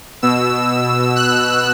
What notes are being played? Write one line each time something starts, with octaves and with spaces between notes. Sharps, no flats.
B2 E6
F#6